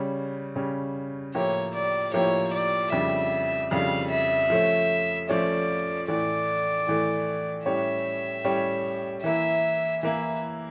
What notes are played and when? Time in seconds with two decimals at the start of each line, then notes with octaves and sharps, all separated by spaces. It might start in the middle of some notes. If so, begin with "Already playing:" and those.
Already playing: C#3 G3 C#4
0.56 C#3 G3 C#4
1.34 A2 F3 A#3 E4 G4 C#5
1.74 D5
2.13 A2 F3 A#3 E4 G4 C#5
2.53 D5
2.92 F2 C#3 G3 D4 E5
3.71 F2 C#3 G3 D4 F5
4.11 E5
4.50 F3 A3 C#4
5.29 F3 A3 C#4 D5
6.08 A2 E3 A3 D5
6.87 A2 E3 A3
7.66 A2 G3 C#4 G4 C#5 E5
8.44 A2 G3 C#4 G4 C#5
9.23 E3 A#3 E4 E5
10.03 E3 A#3 E4 E5